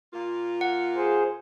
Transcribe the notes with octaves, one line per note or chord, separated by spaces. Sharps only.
A#2 A#3 F4
F#5
G#4 C5